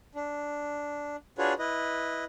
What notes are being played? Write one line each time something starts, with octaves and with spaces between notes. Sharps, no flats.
D4
D4 F4 F#4 G#4 B4 C#5
E4 B4 D#5